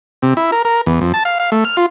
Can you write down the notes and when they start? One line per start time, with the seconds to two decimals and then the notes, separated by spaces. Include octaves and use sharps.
0.22 C3
0.37 E4
0.52 A#4
0.65 A#4
0.86 E2
1.01 F2
1.14 A5
1.25 F5
1.40 F5
1.52 A3
1.65 F6
1.77 F4